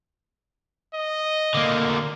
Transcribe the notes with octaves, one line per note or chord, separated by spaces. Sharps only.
D#5
D3 A#3